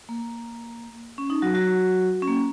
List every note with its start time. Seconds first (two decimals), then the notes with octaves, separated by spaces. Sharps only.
0.09 A#3
1.18 C#4
1.30 D#4
1.42 F#3 F#4
1.55 F#3 F#4
2.22 C#4
2.27 A#3